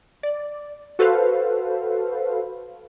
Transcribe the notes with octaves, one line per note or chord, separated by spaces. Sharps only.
D5
F#4 A4 B4 C5 F5